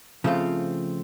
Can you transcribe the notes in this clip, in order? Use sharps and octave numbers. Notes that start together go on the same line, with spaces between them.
C#3 F3 A3 C4 F4